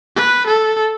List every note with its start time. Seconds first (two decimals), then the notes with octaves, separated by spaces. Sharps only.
0.16 B4
0.47 A4